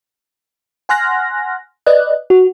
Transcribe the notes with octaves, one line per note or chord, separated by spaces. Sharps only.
F#5 G#5 C6 F6 F#6 A#6
B4 D5 D#5 F#6
F#4